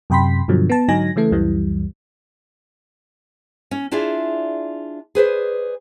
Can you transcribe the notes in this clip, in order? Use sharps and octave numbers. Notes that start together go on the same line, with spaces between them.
F#2 C3 G5 B5 C6 B6
G2 B2 D3 F3 F#3
B3 A5
G#2 D3 F#3 D#4 G#5 A#6
C#3 E3 A3 A4
C#2 F#2 E3 G3
C#4
D4 E4 F4 G#4 D5 E5
G#4 B4 C5 D5